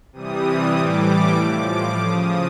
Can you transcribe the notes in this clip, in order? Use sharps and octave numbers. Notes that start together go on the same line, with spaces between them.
C3 E3 G3 D#6
D#6
A2 E3 G3 D6
A2 F3 D6
D6
C#3 F3 D#6